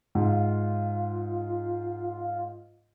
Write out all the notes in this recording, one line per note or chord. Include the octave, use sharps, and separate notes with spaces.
G#2 F4